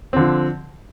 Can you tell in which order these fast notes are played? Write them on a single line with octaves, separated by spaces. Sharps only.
C4 D3 F3